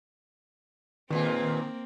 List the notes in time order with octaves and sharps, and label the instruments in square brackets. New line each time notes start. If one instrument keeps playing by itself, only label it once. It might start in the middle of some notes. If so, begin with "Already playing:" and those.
[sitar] A#2 G#3 F4 [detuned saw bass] D#3 [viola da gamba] A#3 C4 [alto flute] B4